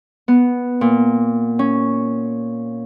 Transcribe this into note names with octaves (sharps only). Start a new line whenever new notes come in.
B3
A#2
C#4